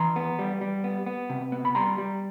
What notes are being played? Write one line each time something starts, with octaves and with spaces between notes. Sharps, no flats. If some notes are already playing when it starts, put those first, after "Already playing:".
Already playing: E3 A#5 C6
B3
G3
G3
B3
B3
C3
B3
B5
G3 A#5 C6
G3